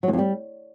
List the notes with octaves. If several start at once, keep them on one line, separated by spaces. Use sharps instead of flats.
F#3
E2
F2
G3